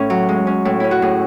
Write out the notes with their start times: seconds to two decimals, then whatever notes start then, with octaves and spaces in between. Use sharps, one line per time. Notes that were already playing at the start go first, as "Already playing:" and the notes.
Already playing: A2 C#4
0.10 F#3
0.29 G#3
0.47 C#4
0.65 A2
0.80 C#4 E4
0.91 F#4
1.02 A2 G#4